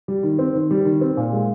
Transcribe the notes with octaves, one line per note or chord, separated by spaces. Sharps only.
G3
D#3
C4
D#3
G3
D#3
C4
A#2
G#3